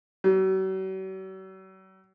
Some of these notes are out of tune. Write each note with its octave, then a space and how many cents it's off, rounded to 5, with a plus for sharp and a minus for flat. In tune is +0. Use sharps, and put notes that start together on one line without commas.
F#3 +45